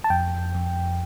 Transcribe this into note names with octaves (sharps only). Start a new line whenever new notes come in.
A5
F2 G5
F2